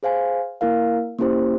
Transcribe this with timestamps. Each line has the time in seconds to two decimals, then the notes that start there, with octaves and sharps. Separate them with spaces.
0.03 G#4 C5 F5 G#5
0.61 A#3 E4 A#4 F5
1.19 A#3 C#4 E4 G4 C5